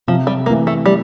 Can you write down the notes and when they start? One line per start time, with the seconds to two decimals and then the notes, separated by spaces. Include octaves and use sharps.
0.08 C3 F3
0.27 G3
0.46 E3 A3 A#3
0.67 A3
0.86 G3